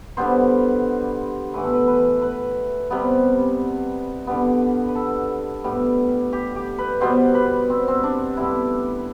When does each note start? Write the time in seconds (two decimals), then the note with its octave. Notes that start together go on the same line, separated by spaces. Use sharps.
0.17 D3 G3 B3 C5
1.54 A2 E3 B3 B4
1.64 A4
1.73 B4
1.88 B4
2.22 B4
2.90 C3 G3 B3
4.27 D3 G3 B3
4.89 B4
4.95 A4
5.64 A2 G3 B3
6.33 G4
6.56 G4
6.78 B4
7.01 B2 G3 B3 C5
7.35 B4
7.70 C4
7.88 C4
8.03 D4
8.37 A2 G3 B3 E4